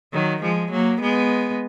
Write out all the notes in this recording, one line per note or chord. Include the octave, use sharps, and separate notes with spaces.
D#3 F#3
F3 G#3
F#3 A#3
G#3 B3